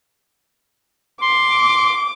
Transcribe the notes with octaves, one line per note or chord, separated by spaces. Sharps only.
C6 D6